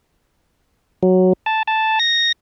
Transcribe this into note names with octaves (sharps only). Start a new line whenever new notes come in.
F#3
A5
A5
A#6